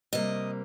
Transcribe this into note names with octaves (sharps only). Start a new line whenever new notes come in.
C3 G3 A#3 D#5